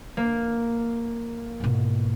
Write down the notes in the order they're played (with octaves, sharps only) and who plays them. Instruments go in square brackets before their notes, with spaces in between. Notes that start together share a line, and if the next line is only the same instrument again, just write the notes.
[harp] A#3
[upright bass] G#2 B2